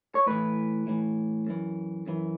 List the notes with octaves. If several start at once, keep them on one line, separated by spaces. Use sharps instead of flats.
C#5
A2 E3 B4
A2 E3
F#2 E3
F#2 E3